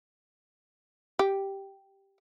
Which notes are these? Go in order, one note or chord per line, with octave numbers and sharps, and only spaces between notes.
G4